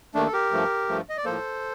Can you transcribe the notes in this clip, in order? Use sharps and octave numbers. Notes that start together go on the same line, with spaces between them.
D#2 D#3 A3 D4
A4
G4 A#4
G2 F3 A3
G2 F3 A3
D#5
D5
A2 F3 A#3 A4 C5